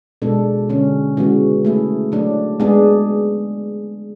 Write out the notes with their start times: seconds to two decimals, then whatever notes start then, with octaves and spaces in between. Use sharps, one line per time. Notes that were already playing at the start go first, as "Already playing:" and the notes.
0.22 B2 G#3 D4 A4
0.69 D3 G#3 C#4
1.17 C#3 E3 G#3 B3 F#4
1.65 A3 E4 G#4
2.12 F#3 A3 D4
2.60 G#3 B3 D4 G#4